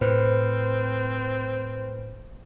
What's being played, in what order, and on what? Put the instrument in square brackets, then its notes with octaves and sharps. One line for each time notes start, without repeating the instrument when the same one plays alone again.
[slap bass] A2 [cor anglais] C4 [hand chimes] B4 C5